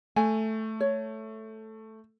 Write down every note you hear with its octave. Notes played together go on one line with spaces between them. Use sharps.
A3 G#5
C#5